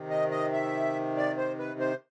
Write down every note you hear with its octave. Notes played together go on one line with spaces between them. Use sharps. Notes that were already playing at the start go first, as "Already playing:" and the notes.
Already playing: C3 D#3
D#5
D#5
E5
D5
C5
B4
C5